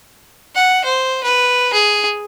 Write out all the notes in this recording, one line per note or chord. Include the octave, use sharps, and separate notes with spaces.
F#5
C5
B4
G#4